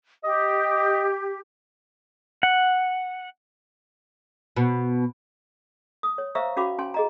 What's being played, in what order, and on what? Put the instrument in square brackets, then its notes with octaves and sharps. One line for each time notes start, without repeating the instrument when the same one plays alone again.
[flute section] G4 [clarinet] D#5
[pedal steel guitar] F#5
[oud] B2
[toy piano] D#6
C#5
C5 E5 F5 A#5 C#6 E6
C#4 F#4 F5 B5 D6
C#4 G#5 C6
G#4 D#5 A#5